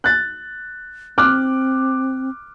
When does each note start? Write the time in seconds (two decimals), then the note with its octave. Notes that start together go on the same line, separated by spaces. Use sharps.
0.04 F#6 A6
1.18 C4 D6 F6 F#6